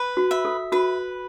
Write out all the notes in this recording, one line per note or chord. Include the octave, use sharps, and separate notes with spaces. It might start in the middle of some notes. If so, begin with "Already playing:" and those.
Already playing: B4
F#4
E5
A4
F#4 B4